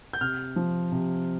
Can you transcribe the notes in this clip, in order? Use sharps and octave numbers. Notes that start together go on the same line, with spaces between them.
G6
C3 F6
F3
C3